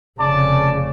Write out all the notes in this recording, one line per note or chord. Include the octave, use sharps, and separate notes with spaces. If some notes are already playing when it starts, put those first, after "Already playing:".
F1 C#3 D5 A5